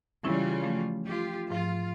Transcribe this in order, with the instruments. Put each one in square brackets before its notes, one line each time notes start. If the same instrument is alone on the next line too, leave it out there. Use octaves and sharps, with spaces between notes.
[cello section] C#3 G3 F4 [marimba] E3 C#4 E4
[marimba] F3 A3 C#4
[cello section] F4 G4
[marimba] G#2 F3 [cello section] F4